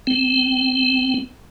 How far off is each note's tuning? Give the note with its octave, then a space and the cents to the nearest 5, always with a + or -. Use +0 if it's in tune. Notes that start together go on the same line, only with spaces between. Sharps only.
C4 -20